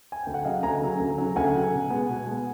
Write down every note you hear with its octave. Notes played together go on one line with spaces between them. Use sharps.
G#5
D2 G5
F#5
C#3 F#3 D#5 F5
D2 G#5 A#5
C#3 F#3
D2
C#3 F#3
D2 F#5 G#5
C#3 F#3
B2
G#3 B3
B2
G#3 B3